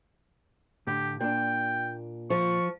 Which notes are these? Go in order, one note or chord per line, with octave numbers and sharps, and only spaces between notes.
A2 D3 G4
A#2 D4 G5
F3 C#6